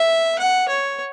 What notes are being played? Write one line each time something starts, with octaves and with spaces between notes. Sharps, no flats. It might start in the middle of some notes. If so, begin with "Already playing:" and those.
Already playing: E5
F#5
C#5